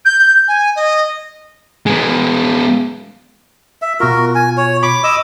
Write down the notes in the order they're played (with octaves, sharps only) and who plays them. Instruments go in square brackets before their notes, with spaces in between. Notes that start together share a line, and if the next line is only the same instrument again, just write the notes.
[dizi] G6
G#5
D#5
[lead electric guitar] G#3 B3
[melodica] E5
[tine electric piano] B2 F4 [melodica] F#4 A#4
[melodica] G#5
C#5
[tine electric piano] B5 C#6 B6 [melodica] D6
[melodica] D#5 D6 E6